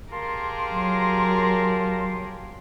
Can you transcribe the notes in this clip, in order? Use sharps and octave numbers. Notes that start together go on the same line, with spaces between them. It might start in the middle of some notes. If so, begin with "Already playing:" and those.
G4 G#4 A#4 F5 A5 C6
F#3